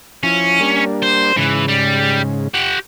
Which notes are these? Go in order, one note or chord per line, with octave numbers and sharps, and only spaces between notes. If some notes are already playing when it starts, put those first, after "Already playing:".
F3 C#4 E4
G3 A#3 D4
C5
G#2 C#3 E3
G3
G4 F#5